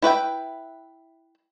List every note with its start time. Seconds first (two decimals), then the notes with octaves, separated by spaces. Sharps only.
0.02 E4 B4 E5 G5